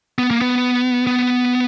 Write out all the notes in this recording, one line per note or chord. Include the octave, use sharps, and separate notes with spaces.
B3
A#3
B3
B3